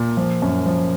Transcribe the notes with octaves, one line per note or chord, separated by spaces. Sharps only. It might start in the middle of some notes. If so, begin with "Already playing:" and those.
Already playing: A#2
F3
F#2
F3